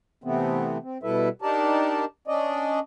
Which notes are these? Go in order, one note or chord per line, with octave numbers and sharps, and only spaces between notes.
C3 E3 A3 B3 C4
C4
B2 G3 E4 A4 B4 E5
D4 D#4 G4 A#4 D5 A5
C#4 D4 D5 D#5